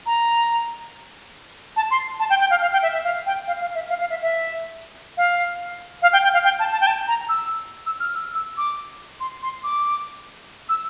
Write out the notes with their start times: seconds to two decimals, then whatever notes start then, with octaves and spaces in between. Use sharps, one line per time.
0.06 A#5
1.77 A5
1.91 C6
2.19 A5
2.30 G5
2.40 G5
2.51 F5
2.62 F5
2.73 G5
2.83 E5
2.93 E5
3.04 F5
3.26 G5
3.47 F5
3.61 F5
3.75 E5
3.89 F5
4.00 F5
4.10 E5
4.22 E5
5.17 F5
6.02 F5
6.13 G5
6.23 G5
6.34 F5
6.44 G5
6.59 A5
6.72 A5
6.81 G5
6.87 A5
7.08 A#5
7.29 E6
7.86 E6
8.00 F6
8.15 E6
8.35 E6
8.57 D6
9.20 C6
9.42 C6
9.64 D6
10.69 E6